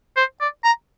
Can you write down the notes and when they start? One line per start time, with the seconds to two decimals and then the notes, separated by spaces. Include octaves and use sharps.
0.17 C5
0.40 D5
0.64 A#5